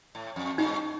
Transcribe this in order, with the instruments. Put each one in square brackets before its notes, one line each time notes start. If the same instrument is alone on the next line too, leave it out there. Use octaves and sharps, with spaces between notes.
[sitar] A2
F2
[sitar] G2 [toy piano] D#4